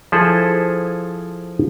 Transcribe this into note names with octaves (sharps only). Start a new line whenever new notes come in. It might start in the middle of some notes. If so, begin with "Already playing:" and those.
F3 E4 G#4 A4 C5